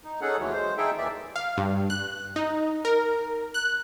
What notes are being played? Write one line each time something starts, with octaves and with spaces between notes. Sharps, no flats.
D#4
C#4 D#4 G#4 A4 F#5
D#2 E3 F#3 G#3 A3
G#3 C5
D#4 E4 G#4 A4 E5 G5
D#2 D#3 E3 D5 E5
F5
G2
F#6
D#4
A#4
F#6